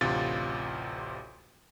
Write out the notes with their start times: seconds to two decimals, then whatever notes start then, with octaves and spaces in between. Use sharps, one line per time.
0.01 A1 D2 C3 F4 A6